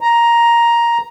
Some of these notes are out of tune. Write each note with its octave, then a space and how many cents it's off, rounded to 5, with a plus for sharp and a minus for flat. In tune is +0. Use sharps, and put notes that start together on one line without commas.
A#5 +10